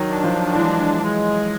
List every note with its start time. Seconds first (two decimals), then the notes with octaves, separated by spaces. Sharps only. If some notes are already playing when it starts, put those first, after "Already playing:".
Already playing: D#3 F#3
0.09 D4
0.24 F3
0.55 E3 G#3
1.02 G#3